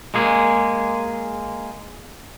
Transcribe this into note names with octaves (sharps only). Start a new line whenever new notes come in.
G#3 A#3 G#4